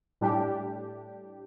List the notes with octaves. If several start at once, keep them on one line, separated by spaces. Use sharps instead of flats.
A2 G3 D4 G4